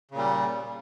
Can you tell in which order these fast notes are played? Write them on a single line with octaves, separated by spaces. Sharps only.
C#3 A#2 G3